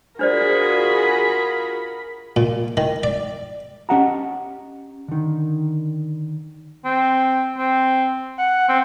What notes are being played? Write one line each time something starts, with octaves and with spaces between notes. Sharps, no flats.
D4 F4 F#4 G#4 A#4 C5 D5 B5
A#2
D#3
D5
C#4 G4 D#5 F#5 A5 A#5
D3 D#3
C4
C4
F#5
C4